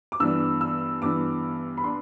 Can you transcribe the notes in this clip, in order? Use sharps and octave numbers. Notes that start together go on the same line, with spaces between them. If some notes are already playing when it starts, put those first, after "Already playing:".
D6
G2 E3 B3 D4 E6
E6
G2 E3 B3 D4 D6
B5
B3 D4 C6